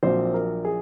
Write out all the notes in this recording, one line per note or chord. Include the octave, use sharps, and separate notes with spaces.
A#1 A#2 F#3 C4 C5
A#4
G#4